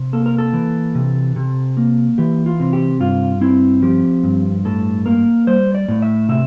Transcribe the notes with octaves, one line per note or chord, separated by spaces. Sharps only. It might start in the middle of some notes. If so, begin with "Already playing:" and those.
Already playing: C3
A#3 A4
A#4
A4
E3
C3
C3
A#3
E3 G4
F4
C3
G4
G2 F4
C4 E4
F3 G4
G2
A2 A4
A#3 A#4
G3 C5
D5
A2
E5
C3 E5